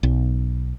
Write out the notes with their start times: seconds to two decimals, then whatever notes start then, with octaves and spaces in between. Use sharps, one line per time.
0.03 B1